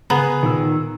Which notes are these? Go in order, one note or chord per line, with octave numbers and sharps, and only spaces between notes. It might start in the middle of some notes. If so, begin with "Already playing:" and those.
C#3 B3 G#4 B4 A#5
A#2 D#3 E6